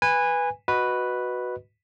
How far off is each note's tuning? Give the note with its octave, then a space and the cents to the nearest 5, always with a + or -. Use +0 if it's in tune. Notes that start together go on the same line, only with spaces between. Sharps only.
B4 +0 G#5 -20
F#4 +0 B4 +0 D#5 +0